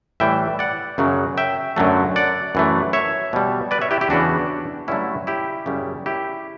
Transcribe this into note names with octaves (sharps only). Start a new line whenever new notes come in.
A2 E3 G3 E5 G5
D5 F#5
F#2 C#3 F#3
E5 G5
F#2 D3 F#3 A3
D5 F#5
F#2 E3 A3
C#5 E5
B2 G3
B4 D5
C#5 E5
E4 G4
E4 G4
E2 C#3 E3 D4 F#4
G2 D3 F#3 A3 C#4 E4
E4 G4
F#2 C#3 G3
E4 G4